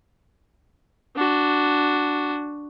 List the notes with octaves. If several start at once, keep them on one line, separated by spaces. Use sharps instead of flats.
D4 F#4